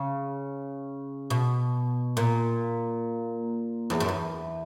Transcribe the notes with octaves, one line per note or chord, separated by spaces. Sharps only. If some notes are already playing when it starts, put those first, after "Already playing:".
Already playing: C#3
B2
A#2
E2
F#2
E2